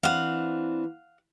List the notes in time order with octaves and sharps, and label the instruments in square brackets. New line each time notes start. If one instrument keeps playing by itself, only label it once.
[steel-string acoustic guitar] E3 C4 D4 [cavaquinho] F5 F#5